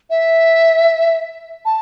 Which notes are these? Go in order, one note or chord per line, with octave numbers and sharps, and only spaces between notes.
E5
A5